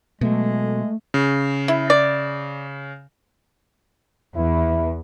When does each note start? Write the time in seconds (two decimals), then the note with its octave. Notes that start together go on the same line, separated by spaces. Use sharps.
0.21 B2 F#3 G#3 A3
1.14 C#3
1.68 E4
1.90 D5
4.36 E2 E4